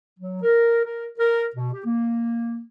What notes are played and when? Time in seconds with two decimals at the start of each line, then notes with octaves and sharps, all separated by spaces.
0.19 F#3
0.43 A#4
0.85 A#4
1.19 A#4
1.56 B2
1.73 G4
1.85 A#3